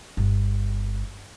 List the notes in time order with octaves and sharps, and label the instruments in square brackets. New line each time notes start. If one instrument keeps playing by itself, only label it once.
[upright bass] G1